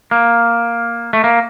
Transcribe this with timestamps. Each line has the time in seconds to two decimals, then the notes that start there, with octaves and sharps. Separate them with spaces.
0.11 A#3
1.13 A3
1.24 A#3